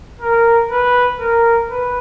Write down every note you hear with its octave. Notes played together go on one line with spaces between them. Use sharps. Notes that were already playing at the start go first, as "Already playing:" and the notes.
A#4
B4
A#4
B4